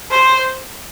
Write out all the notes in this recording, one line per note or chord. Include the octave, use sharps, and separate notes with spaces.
C5